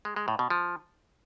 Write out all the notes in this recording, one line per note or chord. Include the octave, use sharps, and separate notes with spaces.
G#3
G#3
A2
B2
F3